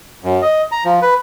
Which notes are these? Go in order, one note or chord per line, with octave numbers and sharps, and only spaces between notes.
F#2
D#5
A#5
F3
B4